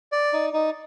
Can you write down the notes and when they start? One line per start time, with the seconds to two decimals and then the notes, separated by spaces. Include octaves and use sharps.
0.12 D5
0.33 D#4
0.53 D#4